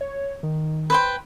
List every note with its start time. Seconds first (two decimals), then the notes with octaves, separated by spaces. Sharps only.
0.01 C#5
0.43 D#3
0.90 B4 C5 G5